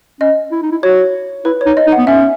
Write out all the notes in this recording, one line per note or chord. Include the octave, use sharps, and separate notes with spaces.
C#4 D#5
E4
D#4
E4
F#4 C#5
E4 B4
D#4 C#5
D#5
D#4
F#5
B3
C#4 E5